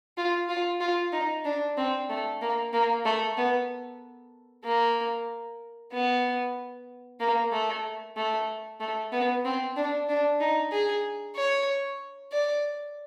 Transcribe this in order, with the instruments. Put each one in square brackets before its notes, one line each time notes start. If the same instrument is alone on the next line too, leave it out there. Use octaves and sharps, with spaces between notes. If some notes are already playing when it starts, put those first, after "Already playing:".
[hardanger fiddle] F4
F4
F4
D#4
D4
C4
A3
A#3
A#3
A3
B3
A#3
B3
A#3
A3
A3
A3
B3
C4
D4
D4
D#4
G#4
C#5
D5